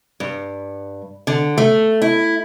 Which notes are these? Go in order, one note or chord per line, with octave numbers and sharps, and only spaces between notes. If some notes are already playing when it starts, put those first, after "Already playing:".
G2
D3
A3
E4